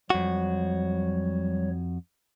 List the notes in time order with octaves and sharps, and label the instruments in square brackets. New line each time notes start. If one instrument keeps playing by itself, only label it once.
[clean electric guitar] F2 F#4 [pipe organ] F#3 G3 C#5